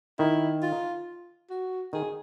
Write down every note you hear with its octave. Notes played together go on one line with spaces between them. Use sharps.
D#3 E4
F4
F#4
D#3 G#4